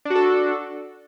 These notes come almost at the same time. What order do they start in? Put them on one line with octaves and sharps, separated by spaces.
D4 F#4 A4